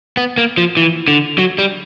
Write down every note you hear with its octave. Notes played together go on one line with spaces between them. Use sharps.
B3
A#3
F3
E3
D3
F#3
G3